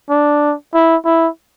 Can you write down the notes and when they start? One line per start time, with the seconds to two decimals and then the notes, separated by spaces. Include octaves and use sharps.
0.10 D4
0.74 E4
1.05 E4